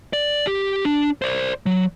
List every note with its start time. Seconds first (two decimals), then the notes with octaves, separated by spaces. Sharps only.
0.13 D5
0.47 G4
0.85 D4
1.22 C5 D5
1.66 F#3